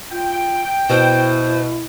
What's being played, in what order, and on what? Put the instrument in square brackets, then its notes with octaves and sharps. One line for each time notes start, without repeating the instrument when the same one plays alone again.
[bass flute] F4 [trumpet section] G5
[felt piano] B2 [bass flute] E4 [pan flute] C5